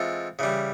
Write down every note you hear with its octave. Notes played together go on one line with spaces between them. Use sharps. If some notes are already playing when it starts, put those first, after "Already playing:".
Already playing: E3 G#3 C4 F4 A4
C#3 E3 G3